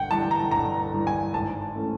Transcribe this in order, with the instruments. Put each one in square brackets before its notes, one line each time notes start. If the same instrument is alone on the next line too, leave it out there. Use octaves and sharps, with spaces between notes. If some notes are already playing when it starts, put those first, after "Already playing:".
Already playing: [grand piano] G1 F#5 G5
G2 E3 A5
A#5
G1 A#5
G2 E3
G#5
G#1 A5
E3 A3 C#4